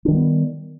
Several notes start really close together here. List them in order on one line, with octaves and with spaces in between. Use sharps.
D4 D#3 G3 B3